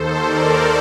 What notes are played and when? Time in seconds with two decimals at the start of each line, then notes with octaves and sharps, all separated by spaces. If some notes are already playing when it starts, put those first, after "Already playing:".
Already playing: D#2 D#3 A4 C5
0.23 A#4 D5